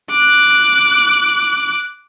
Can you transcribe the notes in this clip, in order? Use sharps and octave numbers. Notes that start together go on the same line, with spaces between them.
D6 F#6